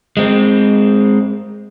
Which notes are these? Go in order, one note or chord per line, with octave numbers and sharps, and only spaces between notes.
G#3 C4